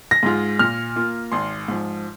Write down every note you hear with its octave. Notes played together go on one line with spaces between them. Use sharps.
A#6
G#2 G#3 F4
A#2 F6
A#3 F4
G#1 C6
G#2 F3